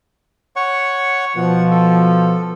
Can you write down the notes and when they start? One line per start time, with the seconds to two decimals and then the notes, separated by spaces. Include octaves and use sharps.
0.56 C#5 F#5 C#6
1.37 B2 F3 F#5
1.71 A4